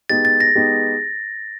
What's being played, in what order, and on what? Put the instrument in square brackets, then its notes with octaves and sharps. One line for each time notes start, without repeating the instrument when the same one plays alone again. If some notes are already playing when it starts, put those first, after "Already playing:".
[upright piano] G#3 B3 D#4 G4 [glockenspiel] A6
[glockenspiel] A6
A#6
[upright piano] G#3 B3 D#4 G4